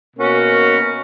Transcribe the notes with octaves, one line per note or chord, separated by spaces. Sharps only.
B2 A#3 C#4 F#4